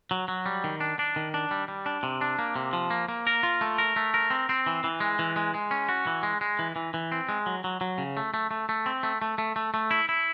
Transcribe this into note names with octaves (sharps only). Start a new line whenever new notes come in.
F#3
F#3
G3
D#3
D4
D4
D#3
D4
G3
G3
D4
C3
D4
A#3
C3
F3
A#3
A#3
A#4
F4
A3
A#4
A3
A#4
C4
C4
E3
E3
G#3
E3
G#3
G#3
C#4
F#4
E3
G#3
G#3
E3
E3
E3
C4
G#3
F#3
F#3
F#3
C#3
A3
A3
A3
A3
C4
A3
A3
A3
A3
A3
E4
E4